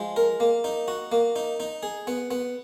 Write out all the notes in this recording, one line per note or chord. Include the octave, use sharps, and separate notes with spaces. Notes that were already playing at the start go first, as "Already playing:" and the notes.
Already playing: F3 G#3
A#4
A#3
D#4
F#4
A#3
D#4
D#4
G#4
B3
B3